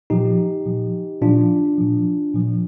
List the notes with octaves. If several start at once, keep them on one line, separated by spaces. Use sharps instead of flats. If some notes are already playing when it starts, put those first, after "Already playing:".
A#2 F3 D#4 G4
A#2 F3
A#2 F3 D4 F4
A#2 F3
A#2 F3